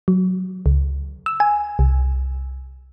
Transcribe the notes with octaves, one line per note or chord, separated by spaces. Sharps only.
F#3
C#2
E6
G#5
C2